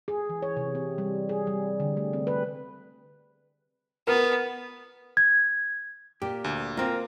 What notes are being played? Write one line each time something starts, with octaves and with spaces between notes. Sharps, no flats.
G#4
E3
C#5
C3
C4
G3
G#4
G3
D3
A3
C4
B4
B3 A#4
G#6
A#2 G4
D2
A#3 C4 F4 A#4